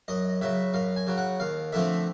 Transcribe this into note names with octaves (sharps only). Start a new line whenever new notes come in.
F#2 D#5
C#3 F#3 E5
F#2 F5
G#5
C#3 F#3
F#5
D#2 F5
D3 F3 A3 C4 E5